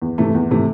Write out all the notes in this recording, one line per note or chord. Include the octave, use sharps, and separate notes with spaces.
E2
C3 E3 A3
E2
C3 E3 A3